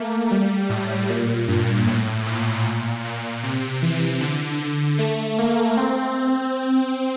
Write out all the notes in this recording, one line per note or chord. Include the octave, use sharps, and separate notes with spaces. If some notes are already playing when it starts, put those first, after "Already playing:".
Already playing: A3 A#3
G3
A2
A#2
G2
A2
A#2
A#2
A#2
C3
E3
D3
A3
A#3
C4